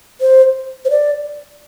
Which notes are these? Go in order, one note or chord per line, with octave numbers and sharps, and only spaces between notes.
C5
C5
D5